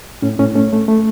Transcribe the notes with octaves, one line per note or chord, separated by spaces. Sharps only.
A2 C#4
A2 C#4
A3 C#4
A3
A3